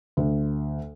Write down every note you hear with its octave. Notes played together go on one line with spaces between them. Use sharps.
D2